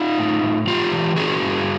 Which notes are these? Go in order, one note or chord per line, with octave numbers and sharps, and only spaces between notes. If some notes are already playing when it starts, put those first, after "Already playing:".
Already playing: D#4 F4
A2
A2
G#3 F4 G4
E3
C#4 F#4 G#4
G2